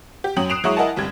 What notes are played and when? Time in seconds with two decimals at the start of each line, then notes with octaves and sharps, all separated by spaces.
0.24 G4
0.36 F#2 F#3 G5 D#6 F#7
0.50 D#6 F#6 C7 D7 E7 F7
0.64 F#3 G#3 E4 C#6 D#6
0.77 E4 A#4 D#5 F#5 G#5 A5
0.96 G1 C2 G3 G#6